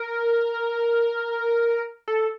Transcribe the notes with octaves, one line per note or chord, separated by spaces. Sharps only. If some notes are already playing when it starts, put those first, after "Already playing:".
Already playing: A#4
A4